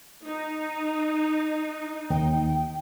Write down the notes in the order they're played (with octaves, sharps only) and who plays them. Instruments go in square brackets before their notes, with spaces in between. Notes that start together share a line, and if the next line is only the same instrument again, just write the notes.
[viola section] D#4
[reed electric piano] D#2 [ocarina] G5